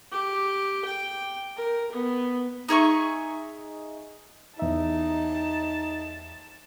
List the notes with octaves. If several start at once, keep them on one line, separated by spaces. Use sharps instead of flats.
G4
G5
A#4
B3
D#4 G#4 E5 C#6
E2 D#4 E5 A5